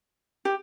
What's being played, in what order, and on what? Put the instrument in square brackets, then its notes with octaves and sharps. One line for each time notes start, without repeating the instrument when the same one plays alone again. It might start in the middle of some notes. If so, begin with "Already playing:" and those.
[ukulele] G4